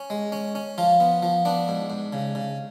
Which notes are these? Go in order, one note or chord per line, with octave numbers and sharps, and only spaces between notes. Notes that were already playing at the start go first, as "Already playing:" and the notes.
Already playing: C#4
G#3
C#4
C#4
F3 F4
B3
F3
B3 D4
G#2
G#2
C#3
C#3